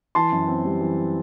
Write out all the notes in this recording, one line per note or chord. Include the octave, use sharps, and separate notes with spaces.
E3 A5 C6
F#2
C4
G3
E3